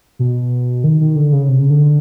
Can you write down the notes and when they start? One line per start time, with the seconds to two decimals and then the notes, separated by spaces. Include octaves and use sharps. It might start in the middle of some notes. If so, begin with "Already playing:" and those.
0.19 B2
0.84 D#3
1.00 D#3
1.16 D3
1.32 C#3
1.49 C3
1.59 C#3
1.70 D3